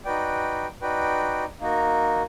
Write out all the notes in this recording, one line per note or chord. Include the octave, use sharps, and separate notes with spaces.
D#4 F#4 B4 D5 G5
D#4 F#4 B4 D5 G5
A#3 D#4 F#4 A#4